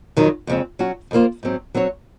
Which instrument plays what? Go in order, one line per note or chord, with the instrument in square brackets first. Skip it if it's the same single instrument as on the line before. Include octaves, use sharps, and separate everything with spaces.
[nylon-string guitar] F2 D#3 F#3
F2 C#3 G#3 C4
F#3 C#4 F#4
F2 D#3 A#3 F4 C5
G#2 F#3 C4
F#3 C4 F#4 C#5